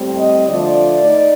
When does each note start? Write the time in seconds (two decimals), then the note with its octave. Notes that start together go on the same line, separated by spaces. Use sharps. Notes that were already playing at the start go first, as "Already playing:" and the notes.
Already playing: A2 G3 C4
0.18 D#5
0.47 D3 F3 A3 D5
1.04 D#4